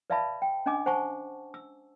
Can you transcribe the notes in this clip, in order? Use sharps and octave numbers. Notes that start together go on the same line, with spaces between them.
B4 D5 E5 F5 A5 B5
G5
C#4 D4 D#5 G#5 D6
C5 F#5 G#5 A5 C#6
E6